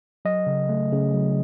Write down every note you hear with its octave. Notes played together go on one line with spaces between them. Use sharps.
F#3 D#5
C#3
A3
C#3
F#3